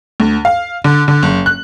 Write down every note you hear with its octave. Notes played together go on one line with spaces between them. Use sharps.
D2
F5
D3
D3
F#1
F#6